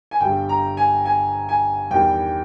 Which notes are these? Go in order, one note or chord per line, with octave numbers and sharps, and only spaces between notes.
G#5
G1 G2 G3 G5
A#5
G#5
G#5
G#5
E2 D#3 G3 G5